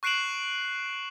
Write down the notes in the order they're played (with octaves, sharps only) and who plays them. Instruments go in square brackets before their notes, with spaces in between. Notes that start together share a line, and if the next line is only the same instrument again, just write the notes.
[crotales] C#6 F#6 C7 D7 E7 F#7